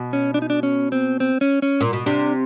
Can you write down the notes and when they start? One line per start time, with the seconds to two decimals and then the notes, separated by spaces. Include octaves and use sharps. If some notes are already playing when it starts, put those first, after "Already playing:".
Already playing: B2
0.13 C#4
0.34 D4
0.42 D#4
0.50 D4
0.63 C#4
0.92 C4
1.20 C4
1.41 C#4
1.62 C#4
1.81 A#2
1.93 B2
2.06 C3 D4